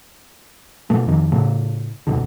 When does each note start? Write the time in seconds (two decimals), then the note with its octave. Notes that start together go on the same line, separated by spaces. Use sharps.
0.90 B2 A3
1.06 F2 D#3
1.32 A2 C#3 A3
2.07 E1 D2 B2 D3